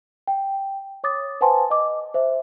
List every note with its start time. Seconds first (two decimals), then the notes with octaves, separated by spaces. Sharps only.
0.27 G5
1.04 C#5 D6 D#6 A6
1.41 B4 C5 F#5 G#5 A5 C6
1.70 D#5 D6
2.14 C5 E5